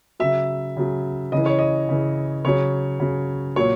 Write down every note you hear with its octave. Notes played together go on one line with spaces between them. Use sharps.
C#3 F#3 E5
C#3 F#3
C#3 E3 D#5
C#5
D#5
C#3 E3
C#3 F#3 C#5
C#3 F#3
A#2 F#3 C#5